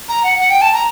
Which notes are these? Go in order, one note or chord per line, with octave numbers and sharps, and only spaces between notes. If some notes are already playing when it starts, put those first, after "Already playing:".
A#5
F#5
F#5
G5
A5
A#5